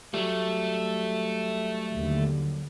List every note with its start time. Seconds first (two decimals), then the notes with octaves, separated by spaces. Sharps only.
0.14 F#3 G3 A3
1.94 D#2 D3